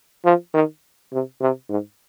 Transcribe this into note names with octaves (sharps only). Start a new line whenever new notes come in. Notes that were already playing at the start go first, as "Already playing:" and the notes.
F3
D#3
C3
C3
G#2